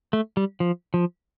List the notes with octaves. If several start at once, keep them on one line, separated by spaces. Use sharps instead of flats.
A3
G3
F3
F3